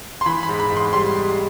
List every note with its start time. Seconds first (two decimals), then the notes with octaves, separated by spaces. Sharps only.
0.21 C6
0.26 E3 B5
0.43 B5
0.49 G#2
0.60 B5
0.71 G#2
0.77 C6
0.93 G3 C6